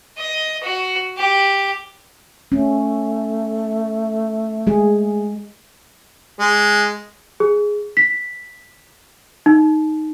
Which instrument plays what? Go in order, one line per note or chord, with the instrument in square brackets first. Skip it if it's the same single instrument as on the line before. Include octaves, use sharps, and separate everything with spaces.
[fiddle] D#5
F#4
G4
[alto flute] A3 [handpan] C#4
[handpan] G#3 G#4
[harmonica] G#3
[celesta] G#4
B6
D#4